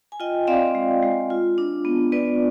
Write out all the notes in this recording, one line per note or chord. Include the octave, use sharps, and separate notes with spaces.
G#5
F4 D#5 G5
C4 D5 F5
G#3
G#3
F4
D4
B3
B3 B4 D5